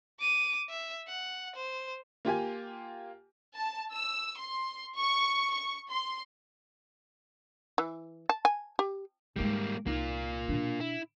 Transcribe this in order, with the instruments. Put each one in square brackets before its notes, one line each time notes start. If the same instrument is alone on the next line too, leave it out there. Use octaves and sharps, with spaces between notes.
[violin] D6 D#7
E5
F#5
C5
[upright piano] A#3 F4 G4 G#5
[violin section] A5
E6
C6
C#6
C#6
C6
[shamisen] E3
A5
G#5
G4
[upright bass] G#2 G#3 [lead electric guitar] G3 A#3
[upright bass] C2 D#4 [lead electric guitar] A#3 F4
[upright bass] B2 D4
[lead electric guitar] E4